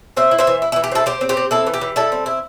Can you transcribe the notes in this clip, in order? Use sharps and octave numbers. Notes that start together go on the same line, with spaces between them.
C4 C5 E5
E4
C5 E5
E3
E4
E4
E3
G4
C4 E4 A4
C4 G4 C5
C4
G4 C5
C4
C4 E4 A4
E3
G4
E3
G3 E4 A4
C4
E4